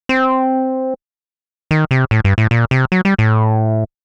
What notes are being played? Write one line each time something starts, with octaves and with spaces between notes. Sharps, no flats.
C4
D#3
C3
A2
G2
A2
A#2
C3
F#3
G3
A2